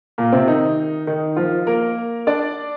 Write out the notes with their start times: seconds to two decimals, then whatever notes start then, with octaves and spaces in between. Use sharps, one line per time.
0.18 A#2 A#3
0.32 C3 C4
0.47 D#3 D#4
1.07 D#3 D#4
1.37 F3 F4
1.67 A#3 A#4
2.27 D4 D5